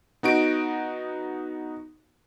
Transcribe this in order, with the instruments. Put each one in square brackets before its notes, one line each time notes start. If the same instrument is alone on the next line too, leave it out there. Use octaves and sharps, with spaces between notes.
[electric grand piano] B3 D#4 F#4 D7